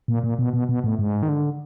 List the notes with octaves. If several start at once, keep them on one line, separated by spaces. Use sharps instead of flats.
A#2
A#2
B2
B2
B2
A2
G#2
D#3
D3